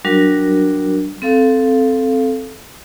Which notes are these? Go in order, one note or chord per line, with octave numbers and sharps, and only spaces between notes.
F#3 G3 D4 F#4 A#4
C4 A4 F5